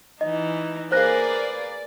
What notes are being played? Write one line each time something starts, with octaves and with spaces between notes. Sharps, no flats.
E3 D#4 D#5
A#3 G#4 B4 C5 D5 F#6 A#6